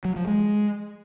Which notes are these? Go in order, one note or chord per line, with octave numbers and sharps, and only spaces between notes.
F#3
F3
G#3